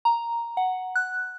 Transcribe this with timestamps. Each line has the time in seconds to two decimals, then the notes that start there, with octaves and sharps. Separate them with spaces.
0.05 A#5
0.57 F#5
0.95 F#6